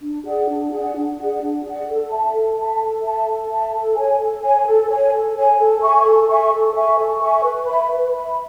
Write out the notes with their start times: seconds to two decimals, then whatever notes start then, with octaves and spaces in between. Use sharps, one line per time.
0.02 D4
0.24 G#4 D5 F#5
0.48 D4
0.70 G#4 D5 F#5
0.95 D4
1.17 G#4 D5 F#5
1.41 D4
1.64 G#4 D5 F#5
1.87 A4
2.10 E5 A5
2.33 A4
2.57 E5 A5
2.80 A4
3.03 E5 A5
3.27 A4
3.50 E5 A5
3.72 A4
3.95 C#5 G#5
4.19 A4
4.42 C#5 G#5
4.66 A4
4.89 C#5 G#5
5.12 A4
5.36 C#5 G#5
5.58 A4
5.82 E5 G#5 C#6
6.05 A4
6.28 E5 G#5 C#6
6.51 A4
6.75 E5 G#5 C#6
6.98 A4
7.20 E5 G#5 C#6
7.44 B4
7.67 E5 B5
7.91 B4
8.14 E5 B5